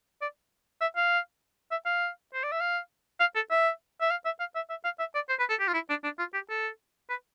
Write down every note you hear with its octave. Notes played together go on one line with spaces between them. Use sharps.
D5
E5
F5
E5
F5
C5
D5
E5
F5
F5
A4
E5
E5
F5
E5
F5
E5
E5
F5
E5
D5
C5
B4
A4
G4
F4
E4
D4
D4
F4
G4
A4
B4